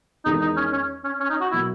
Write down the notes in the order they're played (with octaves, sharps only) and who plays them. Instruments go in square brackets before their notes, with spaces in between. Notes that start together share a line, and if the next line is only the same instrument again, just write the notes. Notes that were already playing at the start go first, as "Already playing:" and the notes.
[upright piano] E2 D#3 G#3 [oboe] D#4
[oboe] D#4
C#4
C#4
C#4
C#4
D#4
F#4
[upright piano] B2 F#3 A#3 [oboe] E4